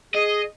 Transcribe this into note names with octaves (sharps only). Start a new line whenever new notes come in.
G#4 D#5